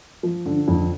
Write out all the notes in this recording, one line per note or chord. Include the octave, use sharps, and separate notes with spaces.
F3
D3
F2